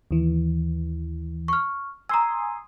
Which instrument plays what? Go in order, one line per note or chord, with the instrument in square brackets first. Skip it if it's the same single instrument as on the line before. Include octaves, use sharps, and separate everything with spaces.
[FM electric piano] D#2 E3
[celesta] C#6 F6
[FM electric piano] G#5 C6 D#6 [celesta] A#5 E6